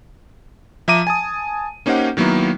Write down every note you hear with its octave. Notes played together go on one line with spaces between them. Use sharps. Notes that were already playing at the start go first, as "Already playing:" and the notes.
F3 E5 A#5 D6 D#7
G#5 A5 D#6
A#3 C#4 D#4 G4 C5 F#5
D#3 F#3 A#3 B3 E4